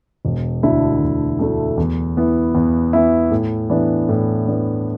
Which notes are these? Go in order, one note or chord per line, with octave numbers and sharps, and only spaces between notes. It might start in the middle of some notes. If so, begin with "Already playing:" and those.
E1
D2 D3 A3 E4
E1
D2 D3 A3 E4
E2
E3 B3 E4
E2
E3 B3 E4
A2
E3 B3 D4
A2
E3 B3 D4